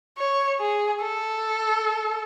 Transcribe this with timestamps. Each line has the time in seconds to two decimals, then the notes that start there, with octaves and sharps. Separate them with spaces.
0.18 C#5
0.60 G#4
1.02 A4